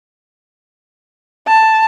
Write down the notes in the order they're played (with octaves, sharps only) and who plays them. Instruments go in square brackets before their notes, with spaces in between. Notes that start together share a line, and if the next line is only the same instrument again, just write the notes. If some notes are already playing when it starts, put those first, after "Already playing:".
[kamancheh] A5